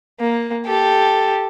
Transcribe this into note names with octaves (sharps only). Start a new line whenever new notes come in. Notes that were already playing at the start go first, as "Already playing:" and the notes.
A#3
G4 A4